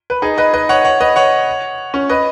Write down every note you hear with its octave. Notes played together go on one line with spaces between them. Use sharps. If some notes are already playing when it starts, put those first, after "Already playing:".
B4
D#4 G#4
B4 D#5
B4 D#5
C#5 F#5
C#5 F#5
B4 D#5
C#5 F#5
C#4
B4 D#5